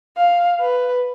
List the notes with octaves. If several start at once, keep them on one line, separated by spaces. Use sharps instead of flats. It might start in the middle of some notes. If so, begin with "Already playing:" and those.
F5
B4